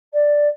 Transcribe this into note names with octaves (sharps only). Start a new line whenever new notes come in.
D5